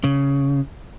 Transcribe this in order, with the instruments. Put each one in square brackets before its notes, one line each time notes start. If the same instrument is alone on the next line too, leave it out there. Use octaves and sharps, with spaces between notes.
[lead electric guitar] C#3